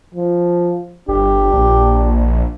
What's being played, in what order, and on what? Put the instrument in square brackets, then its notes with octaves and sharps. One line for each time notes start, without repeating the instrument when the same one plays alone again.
[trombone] F3
[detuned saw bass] G1 [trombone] D4 [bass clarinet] G4
[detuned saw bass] A#1